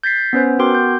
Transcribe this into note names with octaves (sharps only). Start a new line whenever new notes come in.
G6 A6 B6 C7
B3 C#4 B4 C5
B3 F#4 A#4 G5 C6 D6
G6